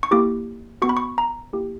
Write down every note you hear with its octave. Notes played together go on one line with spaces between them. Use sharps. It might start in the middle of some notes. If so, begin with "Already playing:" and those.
C#6
A#3 E4 G4 D6
B3 F#4 C#6
B5
C#6
A#5
A#3 E4 G4